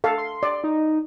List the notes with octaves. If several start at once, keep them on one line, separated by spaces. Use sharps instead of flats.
A4 F5
C6
D5
D#4